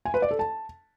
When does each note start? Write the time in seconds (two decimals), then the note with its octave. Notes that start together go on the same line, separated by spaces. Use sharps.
0.05 G#5
0.14 B4
0.22 D5
0.31 A4
0.39 A5